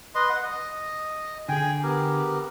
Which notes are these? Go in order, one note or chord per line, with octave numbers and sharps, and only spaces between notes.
B4 D#5 C6
F#5
D#5
D3 G#4 G5 G#5
B3 G4 A#4